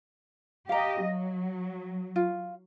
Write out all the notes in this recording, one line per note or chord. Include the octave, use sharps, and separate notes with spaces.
G4 D#5 F5 A#5
F#3
F4